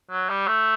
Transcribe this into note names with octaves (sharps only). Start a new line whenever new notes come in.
F#3
G3
A3